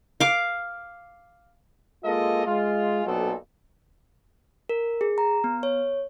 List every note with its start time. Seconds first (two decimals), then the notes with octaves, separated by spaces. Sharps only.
0.20 F5 D6
2.04 G#3 A#3 F4 A4 A#4 D#5
2.46 G#3 F4
3.05 B1 A#2 F#3 B3 C4 A4
4.69 A#4
5.01 G#4
5.18 A#5
5.44 B3
5.63 C#5